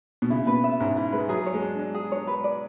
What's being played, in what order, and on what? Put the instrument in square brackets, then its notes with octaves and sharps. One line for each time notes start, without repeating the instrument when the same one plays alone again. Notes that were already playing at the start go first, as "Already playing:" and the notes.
[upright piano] B2
[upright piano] C#3 [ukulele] E4
[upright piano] B2 [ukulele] B4
[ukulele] E5
[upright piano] G#2 [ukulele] C#4
[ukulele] E4
[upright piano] G#3 [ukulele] B4
[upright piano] F#3 [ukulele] G#4
[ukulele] C#5
[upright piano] G#3
[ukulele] D4
D4
G#4
C#5
B4
D5